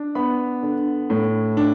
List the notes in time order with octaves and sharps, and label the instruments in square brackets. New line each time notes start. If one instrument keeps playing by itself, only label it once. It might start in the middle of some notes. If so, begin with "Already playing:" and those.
Already playing: [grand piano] D4
B3 B5
D3
A2
D4